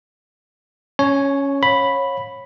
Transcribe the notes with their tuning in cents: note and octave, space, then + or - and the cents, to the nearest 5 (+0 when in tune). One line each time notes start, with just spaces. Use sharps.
C#4 +0 C#5 +0 G#5 +35
C#5 -20 F5 +35 B5 +0